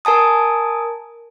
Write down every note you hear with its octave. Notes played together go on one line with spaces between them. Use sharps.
A#4 G#5 A5 D#6